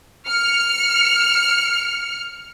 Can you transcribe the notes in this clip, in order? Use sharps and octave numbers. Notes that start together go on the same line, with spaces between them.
F6 C#7